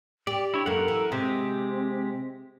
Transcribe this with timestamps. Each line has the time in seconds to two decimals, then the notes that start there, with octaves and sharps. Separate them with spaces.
0.27 G4 D5
0.54 D4 E4 C#5
0.66 F#2 A#3 A4 A#4 F#5
0.88 E3
1.12 C3 G#3 C4 G4